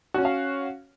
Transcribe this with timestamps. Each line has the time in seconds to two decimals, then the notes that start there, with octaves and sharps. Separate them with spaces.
0.14 F#4
0.18 C#4
0.21 C#5
0.25 F5